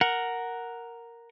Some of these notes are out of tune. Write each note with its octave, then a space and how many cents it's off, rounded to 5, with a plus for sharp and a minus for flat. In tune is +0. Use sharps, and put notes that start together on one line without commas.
A#4 +0 F#5 +0